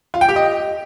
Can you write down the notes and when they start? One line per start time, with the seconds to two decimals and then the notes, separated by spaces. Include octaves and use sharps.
0.14 F4
0.21 G5
0.29 G4
0.36 D#5